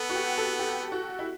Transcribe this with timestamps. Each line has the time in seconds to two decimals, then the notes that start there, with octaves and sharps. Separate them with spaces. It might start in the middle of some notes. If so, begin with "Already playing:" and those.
Already playing: B3 A4
0.10 F#4
0.15 G4
0.38 A4
0.59 G4
0.92 F#4
1.19 E4